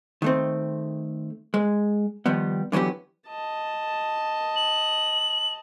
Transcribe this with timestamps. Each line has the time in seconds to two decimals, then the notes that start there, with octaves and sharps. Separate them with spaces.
0.22 D#3 A3 C4
1.54 G#3
2.26 D#3 F3 G3 B3
2.72 D3 E3 F#3 B3 G4
3.28 D#5 A5
4.56 F#7